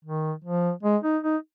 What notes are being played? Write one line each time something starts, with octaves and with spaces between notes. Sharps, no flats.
D#3
F3
G#3
D#4
D#4